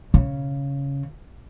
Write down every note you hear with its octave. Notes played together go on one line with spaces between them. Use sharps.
C#3